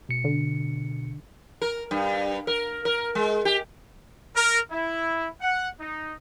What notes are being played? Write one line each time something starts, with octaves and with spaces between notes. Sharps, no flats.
B2 C#7
D3
A#4
G2
A#4
A#4
G#3
G4
A#4
E4
F#5
D#4